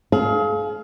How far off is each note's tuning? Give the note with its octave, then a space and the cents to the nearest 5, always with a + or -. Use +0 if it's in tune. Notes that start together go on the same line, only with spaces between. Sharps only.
G#4 +40 F5 +0